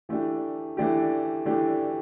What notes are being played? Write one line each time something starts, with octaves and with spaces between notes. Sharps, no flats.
E3 A3 D4 G4
E3 A3 D4 G4
E3 A3 D4 G4